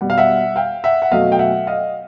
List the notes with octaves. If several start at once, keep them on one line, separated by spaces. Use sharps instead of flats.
B2 G3 F#5
F5
E5 F#5
F5 G5
E5 F#5
F#5
B2 F#3 A3 D#5 F5
G5
E5 F#5
D#5 F5